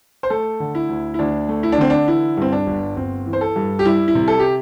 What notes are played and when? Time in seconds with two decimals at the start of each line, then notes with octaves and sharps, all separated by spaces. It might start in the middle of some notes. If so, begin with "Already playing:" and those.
0.23 C5
0.30 A3 A4
0.60 D3
0.75 E4
0.89 D2
1.14 E4
1.19 D2 D4
1.49 A3
1.63 E4
1.72 D4
1.78 D3 C4
1.90 D4
2.07 E3 E4
2.37 G2 C4
2.52 D4
2.67 G1
2.96 G1 C4
3.26 E3
3.33 C5
3.41 A4
3.56 G2
3.79 G4
3.85 G3 E4
4.08 E4
4.15 C3
4.28 A4
4.39 G4